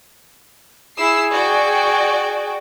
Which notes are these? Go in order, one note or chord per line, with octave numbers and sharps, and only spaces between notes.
E4 G#4 E6 C7
F#4 D5 G5